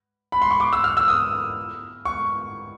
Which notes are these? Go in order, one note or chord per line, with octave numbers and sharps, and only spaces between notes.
B5
C6
C#6
D6
E6
F6
E6
D#6
C#6